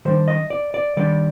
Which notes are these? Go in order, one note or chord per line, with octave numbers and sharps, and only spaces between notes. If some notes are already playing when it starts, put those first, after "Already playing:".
D#3 G3 D4 C5
D#5
D5
D5
D#3 G3 D4 D5